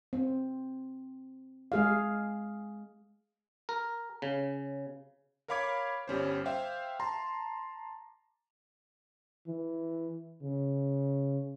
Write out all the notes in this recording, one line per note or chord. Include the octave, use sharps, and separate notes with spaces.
C4
G#3 G#4 F5
A#4
C#3
A#4 C#5 F5 B5 D6 G#6
G1 G3 C#4 C5
C5 E5 F5 G5
A5 A#5 C6
E3
C#3